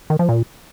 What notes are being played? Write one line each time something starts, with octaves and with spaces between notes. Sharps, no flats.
D#3
F3
A#2